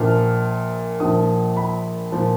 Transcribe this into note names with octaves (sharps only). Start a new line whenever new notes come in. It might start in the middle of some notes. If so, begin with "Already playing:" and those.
Already playing: A#1 A#2 F3 F6
A#1 A#2 F3 D#6
B5
A#2 F3